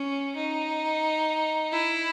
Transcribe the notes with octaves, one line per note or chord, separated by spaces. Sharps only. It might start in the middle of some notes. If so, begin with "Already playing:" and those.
Already playing: C#4
D#4
E4